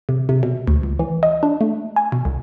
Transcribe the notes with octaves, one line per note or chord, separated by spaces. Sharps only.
C3
C3
B2
D2
C#2
E3
D#5
D4
A3
G#5
B2
C2